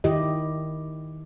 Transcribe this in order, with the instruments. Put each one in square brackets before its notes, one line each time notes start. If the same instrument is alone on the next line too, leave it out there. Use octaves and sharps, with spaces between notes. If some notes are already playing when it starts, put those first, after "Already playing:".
[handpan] D#3 E4 G4 D#5